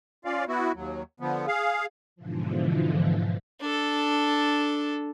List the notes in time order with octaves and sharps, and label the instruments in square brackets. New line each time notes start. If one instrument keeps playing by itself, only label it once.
[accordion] C#4 F4 D5 F5
B3 E4 F#4
D#2 F#3
D3 F3 B3
G#4 F5
[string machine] G#2 B2 D3 E3 F3
[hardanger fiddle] D4 A4